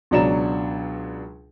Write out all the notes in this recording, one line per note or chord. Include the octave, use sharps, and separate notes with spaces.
C#2 B2 F#3 D4 A#5 E7